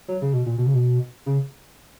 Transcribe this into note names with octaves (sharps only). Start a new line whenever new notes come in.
F#3
C#3
B2
A#2
B2
C#3
B2
C#3